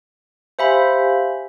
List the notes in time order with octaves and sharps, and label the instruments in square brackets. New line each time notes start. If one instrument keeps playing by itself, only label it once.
[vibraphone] G4 F5 G#5 [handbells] C5 E5 B5